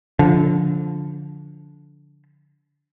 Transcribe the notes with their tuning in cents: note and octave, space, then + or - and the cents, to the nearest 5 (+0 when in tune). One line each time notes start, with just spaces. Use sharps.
D3 -20 F3 +0